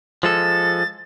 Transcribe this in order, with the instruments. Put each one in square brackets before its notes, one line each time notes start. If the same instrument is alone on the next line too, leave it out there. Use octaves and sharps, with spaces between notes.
[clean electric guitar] F3 G#3 A4 [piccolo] A6